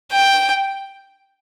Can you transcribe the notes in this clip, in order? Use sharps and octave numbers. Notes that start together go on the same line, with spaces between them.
G5